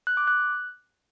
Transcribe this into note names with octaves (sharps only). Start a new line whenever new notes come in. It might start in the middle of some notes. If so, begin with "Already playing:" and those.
F#6
D6
F#6